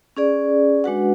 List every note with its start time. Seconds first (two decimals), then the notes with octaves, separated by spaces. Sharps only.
0.17 C#4 G#4 D5
0.84 G#3 D4 F#4 B4 F#5